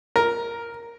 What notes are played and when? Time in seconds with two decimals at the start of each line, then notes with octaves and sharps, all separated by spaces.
0.16 A#4